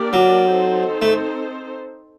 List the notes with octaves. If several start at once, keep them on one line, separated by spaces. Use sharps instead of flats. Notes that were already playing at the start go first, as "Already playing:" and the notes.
Already playing: A#3 D4 G4 A#4 D5
F#3
C4 D#4 A4 C5
A3